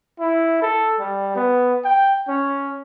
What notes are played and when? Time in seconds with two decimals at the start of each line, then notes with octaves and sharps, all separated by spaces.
0.20 E4
0.62 A4
1.00 G3
1.36 B3
1.85 G5
2.29 C#4